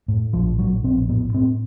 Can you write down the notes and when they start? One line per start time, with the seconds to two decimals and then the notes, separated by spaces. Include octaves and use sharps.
0.08 A2
0.33 A#1 F3
0.58 A2 F#3
0.83 A#1 C4
1.08 A2 B3
1.34 A2 C4